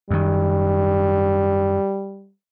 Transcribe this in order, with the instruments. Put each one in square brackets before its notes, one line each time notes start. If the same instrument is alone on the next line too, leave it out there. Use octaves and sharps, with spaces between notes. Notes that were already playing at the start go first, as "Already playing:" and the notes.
[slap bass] F#2 D#3 [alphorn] G3